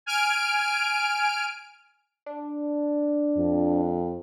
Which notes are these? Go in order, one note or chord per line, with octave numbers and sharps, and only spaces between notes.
G#5 F6 D7
D4
F2